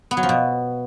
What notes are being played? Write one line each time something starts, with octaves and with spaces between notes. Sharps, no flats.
B3
F#3
F3
B2